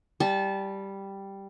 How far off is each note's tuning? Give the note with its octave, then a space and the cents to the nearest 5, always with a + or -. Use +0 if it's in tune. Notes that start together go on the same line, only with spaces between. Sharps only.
G3 +0 A5 -25